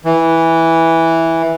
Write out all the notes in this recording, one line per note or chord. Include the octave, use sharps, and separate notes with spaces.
E3